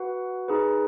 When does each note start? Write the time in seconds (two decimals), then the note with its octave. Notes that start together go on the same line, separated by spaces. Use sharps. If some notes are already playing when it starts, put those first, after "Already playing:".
Already playing: F#4 B4 F#5
0.48 D#4 G#4 B4